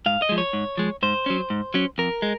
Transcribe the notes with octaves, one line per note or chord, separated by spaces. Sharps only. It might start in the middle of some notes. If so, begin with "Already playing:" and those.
G#2 F5
D#5
F3 G#3
C#5
G#2
F3 G#3
G#2 C5
F#3 C#4
G#2
F#3 C#4
F2 A#4
G#3